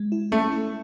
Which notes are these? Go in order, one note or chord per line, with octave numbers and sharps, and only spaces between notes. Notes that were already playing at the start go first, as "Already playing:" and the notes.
Already playing: G#3
E4
A3 C#4
E4